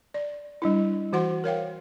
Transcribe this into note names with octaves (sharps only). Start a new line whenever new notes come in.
D5
G3 D4 E4
E3 F#4 C5 F#5 C6
A#4 C#5 F5 G5